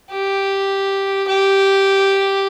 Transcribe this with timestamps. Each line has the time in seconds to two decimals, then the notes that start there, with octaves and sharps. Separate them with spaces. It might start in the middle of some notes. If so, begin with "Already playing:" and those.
0.11 G4
1.27 G4